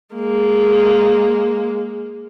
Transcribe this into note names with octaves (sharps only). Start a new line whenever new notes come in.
G#3 A#3